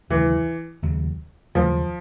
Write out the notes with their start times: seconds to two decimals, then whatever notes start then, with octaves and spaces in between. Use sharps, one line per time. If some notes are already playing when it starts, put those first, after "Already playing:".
0.10 D#2 C#3 E3 F#3
0.82 D#2 C#3 F#3
1.55 D#2 C#3 F3 F#3